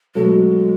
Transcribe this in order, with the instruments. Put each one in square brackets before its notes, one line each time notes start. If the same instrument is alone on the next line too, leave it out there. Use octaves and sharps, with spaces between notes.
[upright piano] B2 F#3 A3 [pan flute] G#3